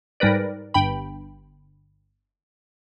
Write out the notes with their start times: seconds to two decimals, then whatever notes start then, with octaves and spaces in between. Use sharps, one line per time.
0.20 G#2 G3 A#4 B4 D5
0.74 G1 G2 G5 B5